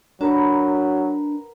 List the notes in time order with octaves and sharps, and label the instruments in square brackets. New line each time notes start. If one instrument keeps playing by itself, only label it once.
[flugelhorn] F#3 [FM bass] D4 [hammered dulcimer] A#4 B4 F#5